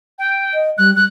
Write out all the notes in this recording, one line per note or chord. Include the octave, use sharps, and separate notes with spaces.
G5
D#5
G3 F#6
G3 F#6